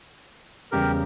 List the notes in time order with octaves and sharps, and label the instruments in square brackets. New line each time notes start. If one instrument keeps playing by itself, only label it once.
[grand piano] E2 C#3 G3 [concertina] G4 A#4